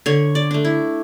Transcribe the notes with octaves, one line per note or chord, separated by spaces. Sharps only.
D3 C#5
D5
A3 D4
E4